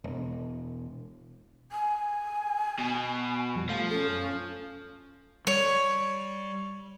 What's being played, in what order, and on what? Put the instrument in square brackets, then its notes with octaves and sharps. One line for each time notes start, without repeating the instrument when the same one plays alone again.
[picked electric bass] E1
[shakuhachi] G#5
[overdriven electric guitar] B2
[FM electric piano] F2 F3 G3
[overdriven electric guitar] F3 [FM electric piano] A3 F5
[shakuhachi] C#4 [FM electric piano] A4
[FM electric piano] F#2
[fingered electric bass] G3 [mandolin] C#5